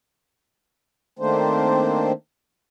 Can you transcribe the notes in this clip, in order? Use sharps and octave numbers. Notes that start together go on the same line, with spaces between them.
D#3 A3 A#3 C4 D4 C5